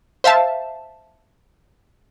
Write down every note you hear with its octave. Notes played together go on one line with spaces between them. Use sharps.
C5 E5 F5 A5